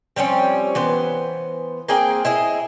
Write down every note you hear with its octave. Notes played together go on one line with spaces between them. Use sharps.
F3 G3 C4 C#4
E3 B3 C5
A#3 C4 G#4 G5
E4 G#4 D#5